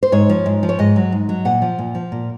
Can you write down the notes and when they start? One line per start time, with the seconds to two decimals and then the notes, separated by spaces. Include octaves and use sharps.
0.03 C5
0.12 G#2 C#5
0.29 F3
0.46 G#2
0.63 F3
0.69 C#5
0.79 G#2 D#5
0.96 F#3
1.12 G#2
1.29 F#3
1.45 A#2 F#5
1.62 F3
1.78 A#2
1.95 F3
2.12 A#2